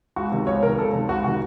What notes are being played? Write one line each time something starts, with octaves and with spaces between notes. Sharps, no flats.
C#2 F#4
C3 D#3
C#2 C#5
C3 D#3 A#4
C#2 A4
C3 D#3
C#2 F#4
C3 D#3 F#4